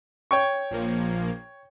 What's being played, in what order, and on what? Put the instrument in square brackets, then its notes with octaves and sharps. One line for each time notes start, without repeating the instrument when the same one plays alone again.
[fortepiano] C#5 G5 C#6
[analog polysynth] A#1 F3 A#3